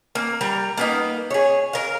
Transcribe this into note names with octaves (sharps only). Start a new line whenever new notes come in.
A#3
G3 A#4 A#5
A#3 B3 D#4
G#4 C#5
A#4 F5